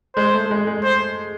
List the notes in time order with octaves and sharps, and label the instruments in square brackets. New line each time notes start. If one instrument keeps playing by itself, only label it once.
[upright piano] G#3 [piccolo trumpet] C5
[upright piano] A3
A3
G#3
G#3
[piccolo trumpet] C5